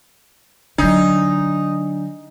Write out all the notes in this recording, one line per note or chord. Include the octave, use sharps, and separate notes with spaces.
D3 F#3 D4 D#4